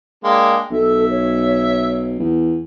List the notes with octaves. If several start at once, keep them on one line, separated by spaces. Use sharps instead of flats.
G#3 A#3 D4 G5
B1 A4 E5
C#5
E2